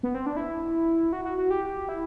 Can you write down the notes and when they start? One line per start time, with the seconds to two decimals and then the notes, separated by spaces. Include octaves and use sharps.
0.03 B3
0.14 C4
0.26 D4
0.37 E4
1.13 F#4
1.25 F#4
1.38 F#4
1.50 G4
1.89 E4